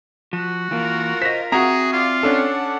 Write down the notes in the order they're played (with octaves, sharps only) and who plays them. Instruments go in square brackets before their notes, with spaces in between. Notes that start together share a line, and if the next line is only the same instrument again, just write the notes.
[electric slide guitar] F3 [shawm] F#4
[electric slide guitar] E3 A#3 [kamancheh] F4 A#4
[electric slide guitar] C5 D#5 [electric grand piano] A#6 B6
[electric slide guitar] C4 E5 [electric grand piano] F#4 A#5 [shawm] G#4
[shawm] F4 [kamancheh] D5 F5
[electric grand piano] C#4 D4 A4 [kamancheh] D5 F#5